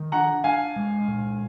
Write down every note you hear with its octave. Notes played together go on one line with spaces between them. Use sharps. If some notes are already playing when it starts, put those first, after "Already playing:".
Already playing: D#3
D4 F#5 A#5
D4 F5 G#5
G#3
A#2